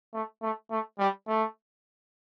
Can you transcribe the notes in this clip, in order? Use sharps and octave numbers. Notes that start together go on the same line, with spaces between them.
A3
A3
A3
G3
A3